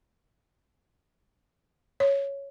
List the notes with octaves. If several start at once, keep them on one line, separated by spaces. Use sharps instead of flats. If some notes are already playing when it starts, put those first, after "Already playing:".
C#5